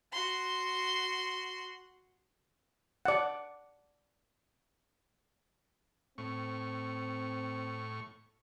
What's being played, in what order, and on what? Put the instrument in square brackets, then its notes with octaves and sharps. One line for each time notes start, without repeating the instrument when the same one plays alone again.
[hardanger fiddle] F#4 C6
[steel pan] D5 F#5
[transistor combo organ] A2 C#6 [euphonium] C4